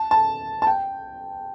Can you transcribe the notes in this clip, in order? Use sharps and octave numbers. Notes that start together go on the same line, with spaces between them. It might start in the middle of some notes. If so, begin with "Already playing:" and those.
Already playing: A5
A5
A5
G5